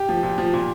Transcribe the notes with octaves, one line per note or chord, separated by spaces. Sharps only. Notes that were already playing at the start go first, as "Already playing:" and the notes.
Already playing: G4
F3
A#2
F3
A#2